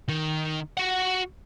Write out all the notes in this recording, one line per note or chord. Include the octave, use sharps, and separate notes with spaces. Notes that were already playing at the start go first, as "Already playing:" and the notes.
D#3
F#4 F#5